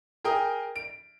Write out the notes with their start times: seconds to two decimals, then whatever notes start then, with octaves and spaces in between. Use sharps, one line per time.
0.24 G#4 A#4 G5 D#6
0.76 D7